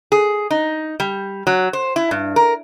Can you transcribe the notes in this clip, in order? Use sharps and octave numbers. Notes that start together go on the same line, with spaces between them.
G#4
D#4
G3
F#3
C5
E4
G2
A#4